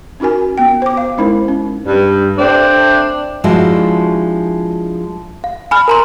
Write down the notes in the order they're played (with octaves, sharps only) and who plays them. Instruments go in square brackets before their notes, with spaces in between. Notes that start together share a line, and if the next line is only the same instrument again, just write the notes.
[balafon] C#4 D#4 F#4 A#4 G#5
B3 G5
C5 D6
F5
G#3 C#4 D#4 E4 A#4 C5
C#4
[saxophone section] G2
A3 C4 D4
[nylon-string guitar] F3 G#3 D4 E4 F#4
[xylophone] F5
G#5 B5 F6
A#4 A#5 C6